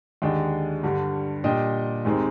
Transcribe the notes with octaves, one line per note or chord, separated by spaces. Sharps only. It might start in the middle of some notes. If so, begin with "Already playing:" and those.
D#2 D3 G#3 D4 D#5 G5
G2 D3 G3
A#2 G3 D4 D#5 G5
D#2 D#3 G#3 C4 D#4